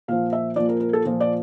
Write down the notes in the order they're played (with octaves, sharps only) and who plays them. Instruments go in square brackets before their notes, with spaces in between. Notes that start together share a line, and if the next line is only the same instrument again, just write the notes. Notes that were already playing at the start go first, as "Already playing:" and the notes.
[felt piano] A#2 F3 F5
E5
A#2 F3 D5
A#4
A#4
A4
A#2 F3
D5